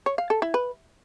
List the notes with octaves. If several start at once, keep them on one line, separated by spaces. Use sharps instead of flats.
C#5
F5
A4
E4
B4